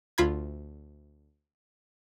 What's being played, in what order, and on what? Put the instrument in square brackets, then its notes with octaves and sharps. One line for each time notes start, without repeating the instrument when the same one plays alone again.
[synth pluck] D2 F4 B5 G#6